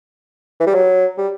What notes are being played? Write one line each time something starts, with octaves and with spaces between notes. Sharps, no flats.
E3
G3
F#3
G3